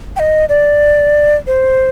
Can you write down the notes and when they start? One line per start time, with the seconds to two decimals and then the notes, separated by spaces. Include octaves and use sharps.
0.16 G5
0.19 D#5
0.49 D5
1.47 C5